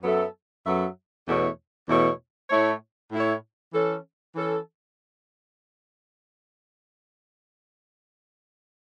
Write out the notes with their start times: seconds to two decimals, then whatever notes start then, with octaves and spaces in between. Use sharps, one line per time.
0.02 F#2 F#3 B3 A4 E5
0.64 F#2 F#3 B3 A4 E5
1.26 E2 B2 A3 E4 C#5
1.87 E2 B2 A3 E4 C#5
2.50 A2 A3 E4 C#5
3.12 A2 A3 E4 C#5
3.74 E3 C#4 A4
4.36 E3 C#4 A4